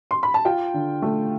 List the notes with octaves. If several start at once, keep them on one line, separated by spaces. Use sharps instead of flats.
C6
B5
A5
F4 G5
D3
A3